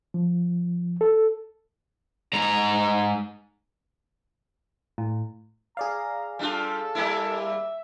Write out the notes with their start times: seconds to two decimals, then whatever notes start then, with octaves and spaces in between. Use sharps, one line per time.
0.14 F3
1.01 A4
2.33 G#2 A#5
4.98 A2
5.77 G#4 D5 F5 A#5
6.39 G3 D4 F4 A4
6.95 G3 A#3 E4
7.47 E5